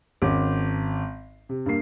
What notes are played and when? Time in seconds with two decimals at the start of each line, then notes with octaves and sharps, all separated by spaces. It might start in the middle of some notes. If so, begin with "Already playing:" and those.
0.22 G#1 C#4 D6
1.49 C3
1.66 G2 G3 A#3 C7